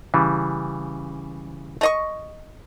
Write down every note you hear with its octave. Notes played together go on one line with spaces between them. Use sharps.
C#3 E3 G3
A3 D#5 C#6